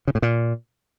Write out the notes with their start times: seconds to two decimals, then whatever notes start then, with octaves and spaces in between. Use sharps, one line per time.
0.07 C#3
0.15 A2
0.22 A#2